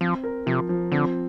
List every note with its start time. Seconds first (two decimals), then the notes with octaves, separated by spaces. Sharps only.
0.01 F3 C4
0.24 A#4
0.46 C3 F3
0.69 F3
0.92 D3 C4